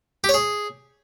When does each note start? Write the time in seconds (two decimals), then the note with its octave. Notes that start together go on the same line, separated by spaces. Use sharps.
0.24 G4
0.29 C#5
0.34 G#4